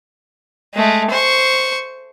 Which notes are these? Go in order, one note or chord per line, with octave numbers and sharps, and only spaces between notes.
G#3 A3
C5 C#6